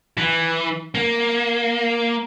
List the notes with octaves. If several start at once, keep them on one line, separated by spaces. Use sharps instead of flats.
E3
A#3